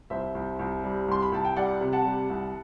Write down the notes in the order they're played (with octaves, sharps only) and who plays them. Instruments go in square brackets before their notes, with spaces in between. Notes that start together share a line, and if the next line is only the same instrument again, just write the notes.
[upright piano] C2 C5 E5
C2
C2
G3
C2 C6
B5
C2 A5
G5
G3 D5 F#5
C3
F#5 A5
G3
C2